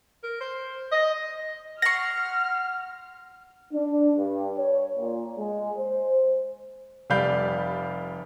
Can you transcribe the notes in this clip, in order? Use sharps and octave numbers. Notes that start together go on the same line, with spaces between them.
A#4
C5
D#5
F#5 C6 C#6 F6 A#6
D4
G2
C#5
A#2
G#3
C5
F1 G3 D5 F5 B5 G6